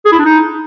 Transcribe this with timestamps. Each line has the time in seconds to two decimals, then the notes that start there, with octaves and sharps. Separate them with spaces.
0.05 G#4
0.12 E4
0.19 D4
0.25 D#4